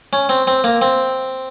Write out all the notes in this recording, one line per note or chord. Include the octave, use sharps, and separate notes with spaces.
C#4
C4
C4
A#3
C4